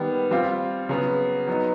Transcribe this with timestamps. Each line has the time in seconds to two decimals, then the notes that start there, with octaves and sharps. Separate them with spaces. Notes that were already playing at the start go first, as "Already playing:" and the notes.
Already playing: D#3 G3 B3
0.31 G3 C4 F4
0.89 C#3 F#3 B3
1.47 F#3 B3 D#4